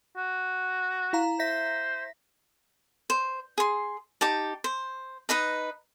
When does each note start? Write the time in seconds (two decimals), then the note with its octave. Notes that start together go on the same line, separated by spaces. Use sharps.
0.17 F#4
1.13 E4 F5 A#5
1.39 C5 E5 A#6 B6
3.10 C5
3.58 G#4 C6
4.21 D#4 G4 A5
4.64 C5
5.29 D#4 B4 D#5 A#5